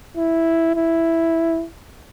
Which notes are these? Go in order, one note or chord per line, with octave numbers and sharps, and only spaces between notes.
E4
E4